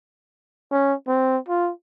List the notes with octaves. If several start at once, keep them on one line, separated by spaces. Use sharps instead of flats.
C#4
C4
F4